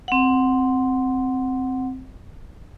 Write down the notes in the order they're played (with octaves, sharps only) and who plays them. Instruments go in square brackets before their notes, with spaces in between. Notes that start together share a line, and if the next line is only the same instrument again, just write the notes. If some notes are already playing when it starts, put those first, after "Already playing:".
[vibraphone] C4 F#5